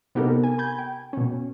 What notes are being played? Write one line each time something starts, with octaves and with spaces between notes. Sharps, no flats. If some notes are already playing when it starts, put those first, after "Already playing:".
C3 B3 D#4 G4 A4 A#4
G#5
B5 G6 G#6
G5
B2 C#4